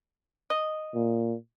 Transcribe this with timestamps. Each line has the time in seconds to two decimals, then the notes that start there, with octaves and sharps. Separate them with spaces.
0.50 D#5
0.95 A#2